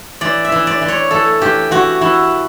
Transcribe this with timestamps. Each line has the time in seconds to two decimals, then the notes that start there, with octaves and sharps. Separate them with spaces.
0.21 E3 D5
0.45 E5
0.52 E3
0.67 D5
0.82 E3
0.88 C#5
1.11 E3 A4
1.42 E3 G4
1.71 E3 F#4
2.01 E3 E4